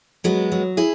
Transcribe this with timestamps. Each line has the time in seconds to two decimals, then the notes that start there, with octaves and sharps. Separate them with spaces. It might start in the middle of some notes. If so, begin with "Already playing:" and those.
0.24 F#3 G#3 B3
0.52 F#3
0.77 E4 G#4